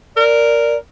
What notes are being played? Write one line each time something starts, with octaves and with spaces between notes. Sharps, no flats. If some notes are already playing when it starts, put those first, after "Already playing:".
A#4 D5